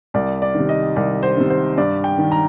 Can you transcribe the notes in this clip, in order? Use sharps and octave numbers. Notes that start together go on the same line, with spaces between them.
C2 D5
D5
D#3
C3
D#5
C2 D5
C5
C3 D#3
C5
G2 D5
G5
D#3
A#5